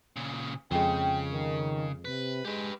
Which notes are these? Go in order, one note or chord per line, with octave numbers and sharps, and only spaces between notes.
A#2 C#3
F2 C#3 G#3 G5
D#3
C3 B4
G#3 G4 B4